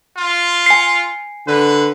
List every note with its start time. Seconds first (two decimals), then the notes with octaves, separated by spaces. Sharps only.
0.17 F4
0.66 G#5 C7
1.48 D3 B4